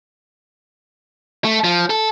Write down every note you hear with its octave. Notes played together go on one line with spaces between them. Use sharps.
A3
F3
A4